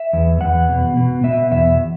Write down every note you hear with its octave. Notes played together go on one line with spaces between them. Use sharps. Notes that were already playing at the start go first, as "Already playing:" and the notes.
Already playing: E5
E2
E2 F#5
B2
B2
B2 E5
E2 E5